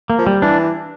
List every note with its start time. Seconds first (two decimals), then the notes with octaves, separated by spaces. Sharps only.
0.10 A#3
0.19 F3
0.27 G3
0.42 E3 D4